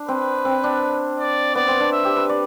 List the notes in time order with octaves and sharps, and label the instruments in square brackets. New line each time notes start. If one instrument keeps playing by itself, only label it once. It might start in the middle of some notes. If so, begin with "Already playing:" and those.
Already playing: [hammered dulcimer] D4
[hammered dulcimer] C4 [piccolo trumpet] B4
[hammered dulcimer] C4
D4
[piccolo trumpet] D5
[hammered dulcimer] B3 [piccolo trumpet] D5
[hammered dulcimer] C4
D4
[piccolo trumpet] E5
[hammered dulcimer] G4
B4
D5